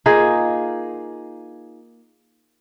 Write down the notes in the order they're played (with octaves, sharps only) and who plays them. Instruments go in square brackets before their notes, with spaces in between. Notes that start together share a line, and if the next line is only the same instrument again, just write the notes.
[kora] A#3 D#4 F4 G#4